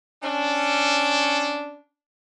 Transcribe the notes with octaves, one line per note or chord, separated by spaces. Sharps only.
C#4 D4